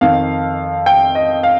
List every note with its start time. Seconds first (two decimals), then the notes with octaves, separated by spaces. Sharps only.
0.01 F2 D#3 F5
0.86 G5
1.15 D#5
1.43 F5